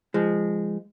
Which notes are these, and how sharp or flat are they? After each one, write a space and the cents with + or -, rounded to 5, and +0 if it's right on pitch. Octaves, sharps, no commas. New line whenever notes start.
F3 -30 G#3 -20